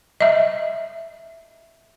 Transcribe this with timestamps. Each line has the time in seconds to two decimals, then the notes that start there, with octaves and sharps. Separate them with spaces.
0.21 D#5 E5